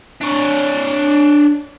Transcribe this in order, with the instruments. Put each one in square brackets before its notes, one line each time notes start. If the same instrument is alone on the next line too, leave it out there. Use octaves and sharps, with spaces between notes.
[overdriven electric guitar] D4 C#5